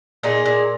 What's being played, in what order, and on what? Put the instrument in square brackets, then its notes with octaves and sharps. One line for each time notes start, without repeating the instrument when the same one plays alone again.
[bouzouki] A#2 D#4 G#4
A#2